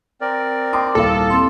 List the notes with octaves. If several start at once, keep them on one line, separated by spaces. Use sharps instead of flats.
C4 A#4 D5
G5 C6 D6 D#6
D#1 C2 A4 F5
C4 C6